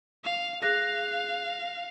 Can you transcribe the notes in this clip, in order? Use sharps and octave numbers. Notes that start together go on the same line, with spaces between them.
F5
G#4 F5 F#6 A#6